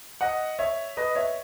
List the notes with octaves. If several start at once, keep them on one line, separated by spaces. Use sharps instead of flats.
D#5 F#5
C#5 E5
B4 D#5
C#5 E5